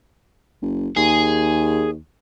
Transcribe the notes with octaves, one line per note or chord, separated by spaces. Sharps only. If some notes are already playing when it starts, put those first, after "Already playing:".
F#1
D#2 G#4